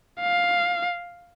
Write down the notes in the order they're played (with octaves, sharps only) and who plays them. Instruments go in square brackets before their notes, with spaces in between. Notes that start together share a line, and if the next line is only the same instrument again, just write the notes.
[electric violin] F5